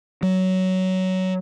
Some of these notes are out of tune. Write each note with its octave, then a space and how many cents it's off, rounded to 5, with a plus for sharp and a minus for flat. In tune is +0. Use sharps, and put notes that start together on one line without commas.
F#3 +15